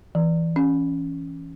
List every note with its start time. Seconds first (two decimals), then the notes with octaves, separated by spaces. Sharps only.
0.15 E3
0.56 C#4